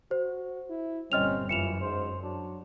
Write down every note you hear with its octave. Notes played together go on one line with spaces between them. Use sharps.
F#4 C5
E4
G1 A#2 G3 C4 C#4 D#5 F6 F7
F#2 E3 F4 C#7 E7 F7
G#2 C5
F#3 D4